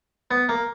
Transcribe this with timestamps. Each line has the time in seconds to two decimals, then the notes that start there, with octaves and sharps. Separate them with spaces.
0.31 B3
0.49 A#3